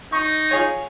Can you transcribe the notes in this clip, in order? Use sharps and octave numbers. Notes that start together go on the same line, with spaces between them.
D#4 C#6
F4 G#4 C#5